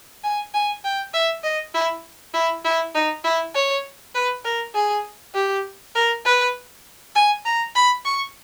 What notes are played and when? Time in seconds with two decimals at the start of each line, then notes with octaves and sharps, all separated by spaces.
0.24 G#5
0.54 G#5
0.84 G5
1.14 E5
1.44 D#5
1.74 E4
2.34 E4
2.65 E4
2.95 D#4
3.24 E4
3.55 C#5
4.15 B4
4.44 A#4
4.75 G#4
5.34 G4
5.95 A#4
6.25 B4
7.15 G#5
7.45 A#5
7.75 B5
8.05 C#6